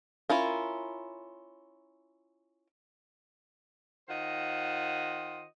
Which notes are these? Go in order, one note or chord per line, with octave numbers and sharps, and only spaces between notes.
C#4 E4 F4 A#4
D#3 F4 C5 D#5 F#5